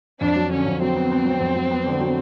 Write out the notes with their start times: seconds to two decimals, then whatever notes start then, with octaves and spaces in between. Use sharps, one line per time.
0.21 F2 D4
0.36 F#3
0.51 D3 C#4
0.66 F2
0.81 F#3 C4
0.96 B3
1.11 B3
1.25 F#3
1.40 F2
1.56 F#3
1.71 B3
1.86 D3
2.00 F#3